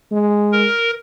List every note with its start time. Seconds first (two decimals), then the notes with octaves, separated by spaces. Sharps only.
0.11 G#3
0.52 A#4